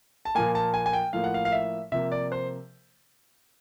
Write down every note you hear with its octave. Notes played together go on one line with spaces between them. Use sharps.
A5
A#2 F3 A#3 G#5
A5
G#5
G#5
G5
A2 F3 A#3 F5
F#5
F5
F5
E5
C3 F3 A#3 E5
D5
C5